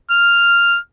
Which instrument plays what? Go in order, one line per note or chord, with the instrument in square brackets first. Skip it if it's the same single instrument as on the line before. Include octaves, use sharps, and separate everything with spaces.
[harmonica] F6